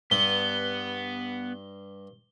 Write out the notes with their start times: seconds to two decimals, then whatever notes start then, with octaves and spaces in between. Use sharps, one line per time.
0.11 G2 B3 G7